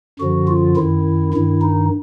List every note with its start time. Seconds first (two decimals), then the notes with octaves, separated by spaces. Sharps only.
0.19 F#2 D3 F3 F#4
0.48 F4
0.76 F#2 D#3 E4
1.33 G2 D#3 E4
1.62 D#4